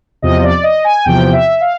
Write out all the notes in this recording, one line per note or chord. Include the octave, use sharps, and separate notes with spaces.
E2 C3 F3 D#5
D5
D#5
G#5
E2 C3 F3 G5
E5
F5